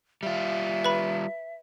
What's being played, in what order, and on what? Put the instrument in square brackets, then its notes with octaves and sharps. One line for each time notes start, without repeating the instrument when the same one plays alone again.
[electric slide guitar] G3 F4 [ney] E5
[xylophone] B4 B5